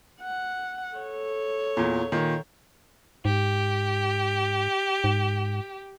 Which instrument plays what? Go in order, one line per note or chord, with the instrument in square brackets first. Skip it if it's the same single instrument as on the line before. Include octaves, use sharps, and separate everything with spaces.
[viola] F#5
A4 C#5
[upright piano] E2 A#2
A#2 D#3
[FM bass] G#2 [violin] G4
[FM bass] G#2